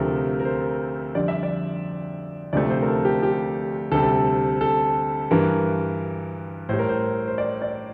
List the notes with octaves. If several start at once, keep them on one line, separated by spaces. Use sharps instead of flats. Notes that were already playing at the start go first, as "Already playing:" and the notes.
Already playing: D2 C3 F3 A3 A#4
A#4
C5
F2 D3 G3 D5
E5
D5
D2 C3 F3 A3 D5
C5
A#4
A4
G4
G4
D2 C3 G3 A4
A4
G2 E3 G3 A#4
A2 G3 C5
A#4
C5
C5
D5
D5